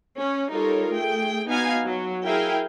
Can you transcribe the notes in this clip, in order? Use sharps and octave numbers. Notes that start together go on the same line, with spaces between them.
C#4
G3 D#4 F4 A4 A#4 C#5
A3 G#4 G5
B3 D#4 F#4 F5 G#5 A#5
F#3
E4 G#4 A#4 F5 G5 G#5